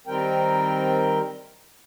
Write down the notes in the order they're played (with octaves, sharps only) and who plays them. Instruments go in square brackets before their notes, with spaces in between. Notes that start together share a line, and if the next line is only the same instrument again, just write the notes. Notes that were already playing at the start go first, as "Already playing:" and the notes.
[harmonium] D#3 G3 C4 A#4 G5